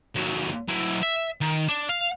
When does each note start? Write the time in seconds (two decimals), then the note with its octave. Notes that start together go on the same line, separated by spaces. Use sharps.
0.15 D#2 F#3
0.69 F#3 E4
1.03 E5
1.41 D#3
1.68 D4
1.89 F5